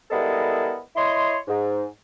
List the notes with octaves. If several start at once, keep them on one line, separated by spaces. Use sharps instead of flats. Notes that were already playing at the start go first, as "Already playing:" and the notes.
G3 G#3 B3 E4 A4 A#4
E4 C#5 D#5 C6
G#2